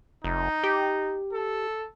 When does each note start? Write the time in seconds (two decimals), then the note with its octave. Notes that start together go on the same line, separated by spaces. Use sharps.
0.24 F1 D#4
0.64 G4
1.33 A4